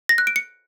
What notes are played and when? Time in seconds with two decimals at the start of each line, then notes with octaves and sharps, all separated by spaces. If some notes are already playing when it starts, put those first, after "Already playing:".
0.09 A#6
0.18 F#6
0.27 D7
0.36 C#7